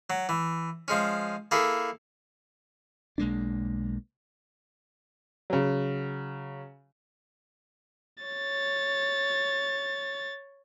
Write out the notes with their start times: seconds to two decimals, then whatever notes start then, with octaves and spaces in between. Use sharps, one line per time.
0.10 F#3
0.29 E3
0.88 F3 G#3 C#4
1.51 A#3 E4 G#4 A4
3.18 B1 G#3 A#3 D4
5.50 C#3 F#3
8.24 C#5 A6